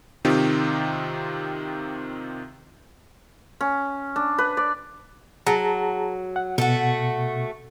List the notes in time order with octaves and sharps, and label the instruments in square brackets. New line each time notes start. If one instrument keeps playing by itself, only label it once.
[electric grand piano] C3 D#3 C4 D#4 F4 G4
[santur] C#4
D4
B4
D5
[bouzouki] F#3 [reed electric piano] G#4 A5 A#5
[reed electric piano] F#5
[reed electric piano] B2 [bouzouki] A3 F#4